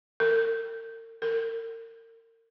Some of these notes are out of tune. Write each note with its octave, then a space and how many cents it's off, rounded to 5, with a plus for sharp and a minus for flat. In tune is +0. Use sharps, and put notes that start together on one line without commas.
A#4 -40
A#4 -35